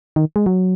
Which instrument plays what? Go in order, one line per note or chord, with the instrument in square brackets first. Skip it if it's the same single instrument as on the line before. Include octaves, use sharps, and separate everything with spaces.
[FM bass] D#3
G#3
F#3